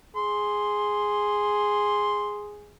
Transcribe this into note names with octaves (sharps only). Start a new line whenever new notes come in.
G#4 C6